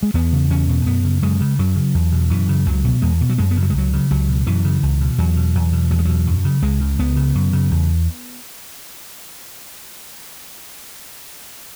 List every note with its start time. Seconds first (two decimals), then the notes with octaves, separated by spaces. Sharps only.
0.03 G#3
0.14 E2 B3
0.33 C#3
0.50 E2 C#4
0.69 B2
0.86 F#2 B3
1.04 C#3
1.22 F#2 G#3
1.41 C#3
1.59 F#2 F#3
1.76 C#3
1.94 E2
2.12 B2
2.30 F#2 E3
2.49 C#3
2.66 C#2 F#3
2.84 B2
3.02 E2 G#3
3.21 B2
3.29 F#3
3.38 F#2 G#3
3.51 B3
3.57 C#3
3.62 F#3
3.70 G#3
3.75 C#2 F#3
3.93 C#3
4.11 C#2 F#3
4.29 B2
4.47 F#2 E3
4.65 C#3
4.83 C#2
5.00 B2
5.18 E2 F#3
5.36 B2
5.55 E2
5.72 B2
5.91 E2 F#3
5.99 G#3
6.05 B2 F#3
6.27 F#2
6.45 C#3
6.62 C#2 G#3
6.81 C#3
6.99 C#2 B3
7.16 C#3
7.35 F#2
7.53 C#3
7.71 E2